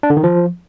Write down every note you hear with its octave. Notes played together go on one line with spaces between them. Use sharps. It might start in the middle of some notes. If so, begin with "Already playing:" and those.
D4
D3
D#3
F3